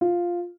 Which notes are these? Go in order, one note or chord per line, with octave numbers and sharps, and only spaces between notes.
F4